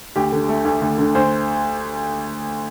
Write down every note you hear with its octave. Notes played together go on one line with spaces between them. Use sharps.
D2 G4
D3
A3
D2
D2
D3
D2 C5